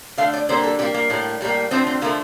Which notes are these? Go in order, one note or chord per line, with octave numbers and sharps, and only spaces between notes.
D3 A3 F5
D5
D3 G3 A#3 C5
A4
D3 G3 A#3 G4
A#3
A2 G3 A#3
A2 G3 A#3
D3 F3 A3 C4
C4
D3 F3 A3 A#3